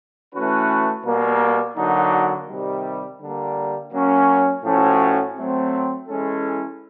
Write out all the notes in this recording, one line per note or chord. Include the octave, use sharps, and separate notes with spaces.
E3 A3 C#4 F#4 B4
B2 G3 A#3
D3 F#3 A#3 D#4 F#4
C3 D#3 G3
D3 G3 A#3
F#3 A#3 C#4
A2 F3 A3 C#4 F#4
F#3 A3 C4
E3 G#3 C#4 E4 A4